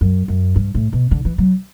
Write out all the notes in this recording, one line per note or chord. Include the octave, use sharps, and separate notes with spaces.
F#2
F#2
G2
A2
B2
D3
E3
F#3